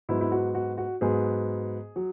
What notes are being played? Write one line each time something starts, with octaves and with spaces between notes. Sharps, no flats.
G#2 F#3 B3 E4
E4
F#4
F#4
F#4
G#2 F#3 B3 G#4
F#3